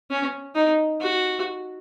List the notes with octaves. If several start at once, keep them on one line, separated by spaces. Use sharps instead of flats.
C#4
D#4
F#4